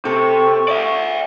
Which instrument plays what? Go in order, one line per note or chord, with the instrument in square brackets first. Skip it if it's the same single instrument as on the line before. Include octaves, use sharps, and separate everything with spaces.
[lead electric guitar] C3 [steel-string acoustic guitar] A4 [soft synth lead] C#6
[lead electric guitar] D5 E5